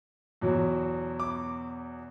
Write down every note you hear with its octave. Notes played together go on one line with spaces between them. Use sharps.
E2 B2 F#3
D6